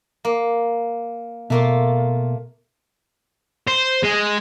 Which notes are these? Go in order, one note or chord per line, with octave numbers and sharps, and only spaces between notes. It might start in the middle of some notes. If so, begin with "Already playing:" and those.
A#3
B2 A3 A#3 F4
C5
G#3